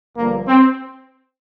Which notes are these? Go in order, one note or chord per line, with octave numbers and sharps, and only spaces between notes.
G1 G2 D3 F3 A#3
C4